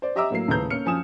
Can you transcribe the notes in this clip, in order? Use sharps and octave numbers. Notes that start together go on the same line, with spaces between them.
C5 D5
G4 D#5 E5 A#5 D6 E6
A2 F#3 A#3 C7
D#1 A2 C#3 B4 A#5 G6
A#3 C#4 F6 C#7
F#2 F3 G#5 D#6 E7